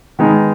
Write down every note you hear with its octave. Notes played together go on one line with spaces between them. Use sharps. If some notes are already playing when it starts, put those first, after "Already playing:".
D#3 G#3 B3 D#4